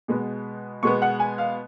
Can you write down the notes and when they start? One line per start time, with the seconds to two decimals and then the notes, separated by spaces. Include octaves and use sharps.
0.08 B2 G#3 B3
0.83 B2 G#3 B3 C#6
1.02 F#5
1.20 G#5
1.38 F5